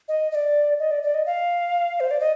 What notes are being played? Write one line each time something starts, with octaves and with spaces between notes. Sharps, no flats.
D#5
D#5
D5
D#5
D5
D5
D#5
F5
C5
D5
D#5